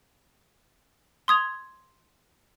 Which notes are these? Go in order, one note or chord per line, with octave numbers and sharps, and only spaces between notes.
C6 D#6 G#6 F7